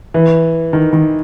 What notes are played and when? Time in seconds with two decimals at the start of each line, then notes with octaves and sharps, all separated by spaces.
0.14 E3
0.73 D#3
0.93 D#3